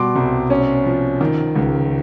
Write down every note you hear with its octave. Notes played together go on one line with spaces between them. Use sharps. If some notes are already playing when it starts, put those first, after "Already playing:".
Already playing: B2 G3 C6 D6
C2
C#4
F3
D#3
C#2